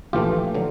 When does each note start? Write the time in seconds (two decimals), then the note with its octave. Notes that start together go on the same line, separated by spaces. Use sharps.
0.13 A#1 A2 E3 A3 F4 G4
0.55 D3 F#3